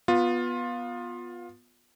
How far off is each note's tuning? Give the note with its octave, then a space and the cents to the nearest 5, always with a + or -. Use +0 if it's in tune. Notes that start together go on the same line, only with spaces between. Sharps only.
B3 -10 F4 +15